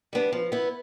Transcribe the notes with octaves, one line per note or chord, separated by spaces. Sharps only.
G3 B3 D4
F3
B3 E4